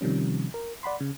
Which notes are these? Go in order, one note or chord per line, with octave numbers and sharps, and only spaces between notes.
C3 D#3 F3 G3 C#4
A#4
D5 F#5 B5 C6
C#3